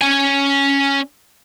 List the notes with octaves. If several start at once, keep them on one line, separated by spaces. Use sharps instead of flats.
C#4 G#5